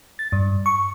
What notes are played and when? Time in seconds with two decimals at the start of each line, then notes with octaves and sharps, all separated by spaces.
0.19 A6
0.32 G2
0.66 C#6